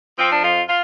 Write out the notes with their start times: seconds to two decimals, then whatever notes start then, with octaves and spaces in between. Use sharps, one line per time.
0.16 F3 C4
0.31 D4
0.42 F2 F4
0.68 F4